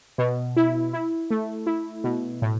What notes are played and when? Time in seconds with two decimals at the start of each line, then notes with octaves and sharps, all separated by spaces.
0.18 B2
0.56 E4
0.93 E4
1.30 A3
1.67 E4
2.04 B2
2.42 A2